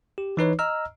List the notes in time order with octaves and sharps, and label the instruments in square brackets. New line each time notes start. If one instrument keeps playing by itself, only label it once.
[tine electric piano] G4
E3 D#4 B4 C#5
D#5 A#5 E6 F6